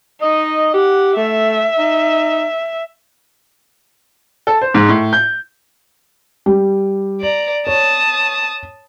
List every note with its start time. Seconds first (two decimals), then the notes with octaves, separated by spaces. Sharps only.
0.22 D#4 D#5
0.74 G4 F#5
1.16 A3 E5
1.78 D#4
4.47 A4
4.61 C5
4.74 G#2
4.89 A2
5.13 G6
6.46 G3
7.20 D5 A#5
7.67 C#5 A5 D#6